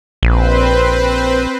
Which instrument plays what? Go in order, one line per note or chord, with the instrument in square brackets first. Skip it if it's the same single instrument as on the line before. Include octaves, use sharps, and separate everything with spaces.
[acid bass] A#1 [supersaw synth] C4 B4 C5